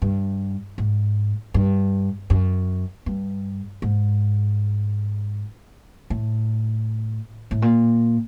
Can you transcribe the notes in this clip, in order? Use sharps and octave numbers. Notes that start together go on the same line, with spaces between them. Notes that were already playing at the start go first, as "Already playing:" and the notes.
G2
G#2
G2
F#2
G2
G#2
A2
A2
A#2